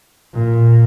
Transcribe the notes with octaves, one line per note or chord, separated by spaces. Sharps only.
A#2